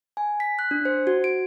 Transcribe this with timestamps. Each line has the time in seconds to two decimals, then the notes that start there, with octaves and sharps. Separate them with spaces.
0.17 G#5
0.40 B6
0.59 F#6
0.71 D4
0.85 C5
1.07 F#4
1.24 D7